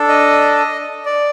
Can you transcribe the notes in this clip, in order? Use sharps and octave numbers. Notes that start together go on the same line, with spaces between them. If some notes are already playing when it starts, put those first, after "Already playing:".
Already playing: D4 A4
D#5
D5